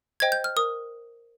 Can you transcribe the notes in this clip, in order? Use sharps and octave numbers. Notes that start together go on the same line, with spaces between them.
C5 D#5 G5 G#6
G6
F6
A#4 D#6